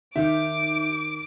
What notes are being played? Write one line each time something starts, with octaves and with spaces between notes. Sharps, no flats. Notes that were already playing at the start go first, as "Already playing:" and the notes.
D#3 D#4 G4 E5 D6